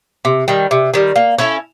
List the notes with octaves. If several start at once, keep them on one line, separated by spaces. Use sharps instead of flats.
C3
D#3 G3
C3
D#3 G3
A#3
C#4 E4 A4